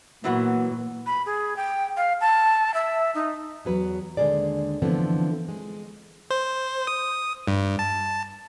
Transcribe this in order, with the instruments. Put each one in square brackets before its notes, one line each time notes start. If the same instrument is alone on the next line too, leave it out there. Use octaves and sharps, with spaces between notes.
[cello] A#2 [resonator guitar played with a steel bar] E3 F#3 B3
[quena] B5
G#4
G5
F5
A5
E5
D#4
[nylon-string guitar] E2 F#3 B4
D#2 D3 G#3 A#3 G#4 D5
D3 E3 F3 A3 B3 C4
G#3
[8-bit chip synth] C5
D#6
G2
A5